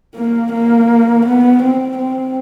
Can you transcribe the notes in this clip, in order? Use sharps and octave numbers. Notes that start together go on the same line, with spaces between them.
A#3
A#3
B3
C4
C4